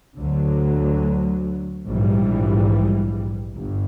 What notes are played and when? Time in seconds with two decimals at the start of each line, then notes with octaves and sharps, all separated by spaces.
0.18 D2 D3 F#3
1.87 A#1 G#2 E3 G3
3.56 G1 G2